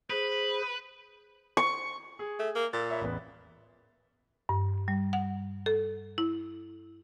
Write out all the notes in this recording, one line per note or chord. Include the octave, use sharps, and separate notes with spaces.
G#4 B4 C5
C#6
G#4
A3
A#3
A#2 E6 A6
C#5 E5 B5
A1 E2 B4
G2
G3
F#5
A4
E4